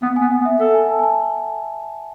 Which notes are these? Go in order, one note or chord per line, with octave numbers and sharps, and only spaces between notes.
B3 F#5
B3 G#5
F#5
B3
E5
A4 F#5
G#5
A5
G#5
A5